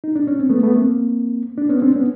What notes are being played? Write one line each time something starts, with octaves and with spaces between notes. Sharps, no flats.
D#4
D4
C#4
C4
A3 B3
A3 B3
A#3 C4
D4
B3 C#4
C4 D4
B3 C#4